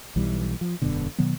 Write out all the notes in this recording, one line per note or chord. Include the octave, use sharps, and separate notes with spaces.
B1 E3 G3
F3
E1 F#2 B2 D3
B2 D#3 F#3 B3